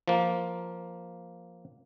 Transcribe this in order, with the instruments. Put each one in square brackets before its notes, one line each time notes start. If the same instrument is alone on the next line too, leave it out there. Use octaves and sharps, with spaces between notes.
[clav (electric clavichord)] F3 A#3